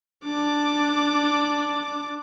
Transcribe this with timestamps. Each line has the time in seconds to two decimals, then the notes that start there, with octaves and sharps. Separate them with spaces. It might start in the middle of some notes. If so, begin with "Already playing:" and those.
0.24 D4 D6